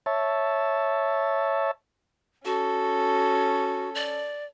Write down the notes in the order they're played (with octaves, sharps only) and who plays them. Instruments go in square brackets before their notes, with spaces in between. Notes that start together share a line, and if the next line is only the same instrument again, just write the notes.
[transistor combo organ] C#5 E5 A5
[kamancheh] C#4 A4 [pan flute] F#4
[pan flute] D5